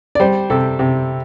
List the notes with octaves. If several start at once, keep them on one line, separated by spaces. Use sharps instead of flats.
D5
G3 C5
C3 A4
C3